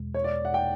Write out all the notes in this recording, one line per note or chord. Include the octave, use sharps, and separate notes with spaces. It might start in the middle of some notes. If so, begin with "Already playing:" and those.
Already playing: E2 B2 G#3
C#5
D5
F#5
G5